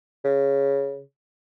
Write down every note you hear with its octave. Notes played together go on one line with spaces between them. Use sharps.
C#3